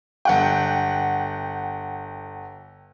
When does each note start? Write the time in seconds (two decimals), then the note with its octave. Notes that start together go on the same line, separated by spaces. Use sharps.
0.25 G1 F#5 G5